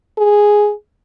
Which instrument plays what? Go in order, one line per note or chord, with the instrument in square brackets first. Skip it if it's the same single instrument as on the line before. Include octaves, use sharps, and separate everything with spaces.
[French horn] G#4